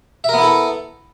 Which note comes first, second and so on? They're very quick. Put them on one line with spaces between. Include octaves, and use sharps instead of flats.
E5 A#4 B3 E4 A4